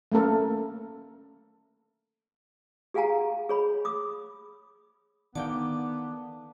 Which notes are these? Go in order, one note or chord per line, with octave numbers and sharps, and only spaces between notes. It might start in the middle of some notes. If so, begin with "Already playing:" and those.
A3 A#3 C#4 A4 A#4
G4 G#4 F5 F#5 G#5 A#5
G#4 C#5 B5
D6 D#6
D3 D#3 A#3 B3 G5 A5 D6